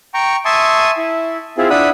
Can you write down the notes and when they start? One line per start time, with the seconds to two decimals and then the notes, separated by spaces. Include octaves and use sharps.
0.14 G5 A#5 C#6
0.45 E5 G#5 A5 C6 C#6 D#6
0.97 E4
1.58 C4 E4 F4 G#4
1.70 D4 E4 F#5 B5 D#6